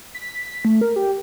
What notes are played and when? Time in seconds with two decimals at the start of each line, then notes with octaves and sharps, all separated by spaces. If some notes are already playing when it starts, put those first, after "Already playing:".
0.15 B6
0.65 A3
0.81 A#4
0.96 G4